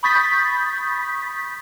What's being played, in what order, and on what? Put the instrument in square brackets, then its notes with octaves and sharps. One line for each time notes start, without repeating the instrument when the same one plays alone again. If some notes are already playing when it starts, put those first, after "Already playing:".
[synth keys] B5 C#6 D#6 G6 A6 B6